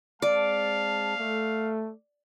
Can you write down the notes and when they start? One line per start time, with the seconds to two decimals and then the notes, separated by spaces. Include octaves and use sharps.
0.22 G#3 C4 D5 F5 A5
1.17 A3